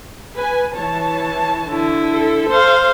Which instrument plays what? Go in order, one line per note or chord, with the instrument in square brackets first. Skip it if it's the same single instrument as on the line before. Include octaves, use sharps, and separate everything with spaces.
[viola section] B4 G#5
E3 C#5 A5
[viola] D3 E4
[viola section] A4
[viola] C5 F5